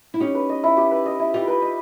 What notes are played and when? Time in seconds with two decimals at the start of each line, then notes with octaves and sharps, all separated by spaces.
0.14 E4
0.20 C#4 D#4 G4
0.35 B4
0.49 D#5
0.64 E4
0.77 G4
0.91 B4
1.06 D#5
1.19 E4
1.34 D#4 F4 G4
1.48 B4
1.62 D#5